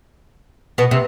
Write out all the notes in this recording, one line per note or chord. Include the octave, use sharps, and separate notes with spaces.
B2 B3
C3 C4